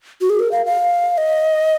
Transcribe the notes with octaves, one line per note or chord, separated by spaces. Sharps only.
F#4
G#4
A#4
F5
F5
D#5